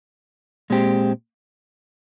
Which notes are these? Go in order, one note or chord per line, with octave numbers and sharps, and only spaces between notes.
A#2 G#3 C4 G4